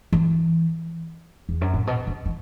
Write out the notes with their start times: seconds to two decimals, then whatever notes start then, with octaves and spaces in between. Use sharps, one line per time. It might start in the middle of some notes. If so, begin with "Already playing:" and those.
0.13 E3
1.49 E2
1.61 F#2
1.74 A2
1.87 B2
2.07 C#3
2.26 E3